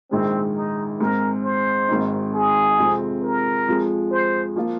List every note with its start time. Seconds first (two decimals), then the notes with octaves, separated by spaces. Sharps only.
0.11 A#1 G#2 D#3 G#3 C4
0.56 D#4
1.00 G#2 G#3 C4 A#4
1.44 C5
1.88 G#1 G#2 D#3 C4 D#4
2.34 G#4
2.78 F2 C3 F3 G#3 C4
3.22 A#4
3.67 F2 F3 G#3
4.11 C5
4.56 F3 A#3 F4